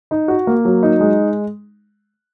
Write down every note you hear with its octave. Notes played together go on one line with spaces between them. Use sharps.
D#4
F#4
A#3
F#3
D#4
G#3